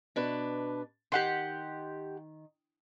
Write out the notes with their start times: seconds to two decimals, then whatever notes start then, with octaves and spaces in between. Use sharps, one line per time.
0.16 B2 D4 B4
1.12 D#3 G4 F#5 C6